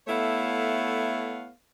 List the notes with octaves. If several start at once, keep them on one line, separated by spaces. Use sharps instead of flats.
A3 B3 E4 A4 C#5 F5